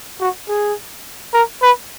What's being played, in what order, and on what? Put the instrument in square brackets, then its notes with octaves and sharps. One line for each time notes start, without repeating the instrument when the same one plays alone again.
[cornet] F#4
G#4
A#4
B4